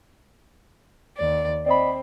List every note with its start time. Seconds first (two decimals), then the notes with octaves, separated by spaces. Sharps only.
1.16 D#2 D5
1.66 C4 D5 D#5 B5